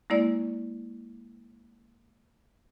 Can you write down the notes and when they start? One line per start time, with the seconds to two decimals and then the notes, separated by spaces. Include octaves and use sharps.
0.10 G#3 A#3 E4 D5